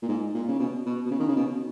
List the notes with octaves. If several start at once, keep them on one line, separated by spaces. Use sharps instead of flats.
A#2
G#2
A#2
C#3
B2
B2
B2
C#3
D#3
C#3
B2